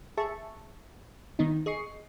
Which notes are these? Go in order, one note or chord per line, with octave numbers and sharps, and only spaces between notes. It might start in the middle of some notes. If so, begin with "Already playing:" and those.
G#4 E5 A5 C#6
D#3 B3 D#4
G#4 D#5 C#6 C7